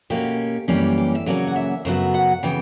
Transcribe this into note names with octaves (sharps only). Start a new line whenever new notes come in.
B2 A#3 C#4 G4
F#2 E3 G3 A#3 C#4 G4
G4
E5
C#3 F#3 A#3 C#4 D5
F#5
E5
F#2 C#3 F#3 B3 E5
F#5
C#3 E3 B3 G5